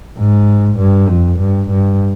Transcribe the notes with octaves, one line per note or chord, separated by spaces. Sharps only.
G#2
G2
F2
G2
G2